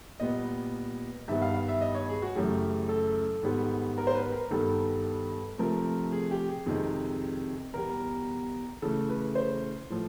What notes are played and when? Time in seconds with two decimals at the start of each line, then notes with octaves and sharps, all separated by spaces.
0.20 A#2 G3 B3 D#5
1.28 G2 D#3 G3 B3 E5
1.42 F5
1.54 F5
1.68 E5
1.81 D#5
1.95 C#5
2.09 G#4
2.22 F#4
2.35 F#2 C#3 E3 A3 G4
2.89 A4
3.43 G#2 D#3 G3 B3
3.98 A#4
4.07 C5
4.15 B4
4.32 A#4
4.51 G2 D#3 G3 B3 A4
5.58 C3 F3 A3 A#4
6.12 G#4
6.31 G4
6.49 G#4
6.66 F2 C3 D#3 G#3
7.74 E2 B2 G3 A#4
8.82 C#3 E3 A3 A4
9.09 B4
9.35 C5
9.90 A2 F3